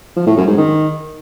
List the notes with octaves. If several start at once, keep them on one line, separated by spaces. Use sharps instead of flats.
F3
A2
F#2
G#2
D#3